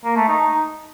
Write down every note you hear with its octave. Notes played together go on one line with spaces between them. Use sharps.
A#3
A3
D#4